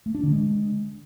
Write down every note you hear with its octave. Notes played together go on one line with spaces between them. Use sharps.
A3
D4
D3
G#3